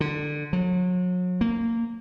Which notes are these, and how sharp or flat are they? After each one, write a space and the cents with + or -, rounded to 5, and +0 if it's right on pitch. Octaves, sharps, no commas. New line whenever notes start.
D3 +15
F#3 -35
A#3 -20